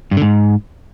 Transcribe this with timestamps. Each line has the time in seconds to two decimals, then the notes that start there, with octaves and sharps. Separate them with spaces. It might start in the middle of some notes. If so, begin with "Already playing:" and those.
0.11 G2
0.17 D3
0.22 G#2